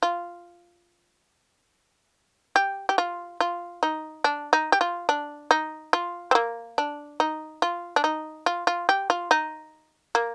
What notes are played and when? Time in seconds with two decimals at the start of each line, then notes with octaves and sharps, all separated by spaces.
0.03 F4
2.56 G4
2.89 G4
2.98 F4
3.41 F4
3.83 D#4
4.24 D4
4.53 D#4
4.72 G4
4.81 F4
5.09 D4
5.51 D#4
5.93 F4
6.31 C4
6.35 A#3
6.78 D4
7.20 D#4
7.62 F4
7.96 D4
8.04 D#4
8.46 F4
8.67 F4
8.89 G4
9.10 F4
9.31 D#4
10.15 A#3